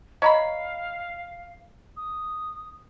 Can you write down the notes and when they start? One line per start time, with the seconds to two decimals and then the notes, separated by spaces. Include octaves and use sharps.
0.22 C#5 D#5 F5 A#5 B5
1.97 D#6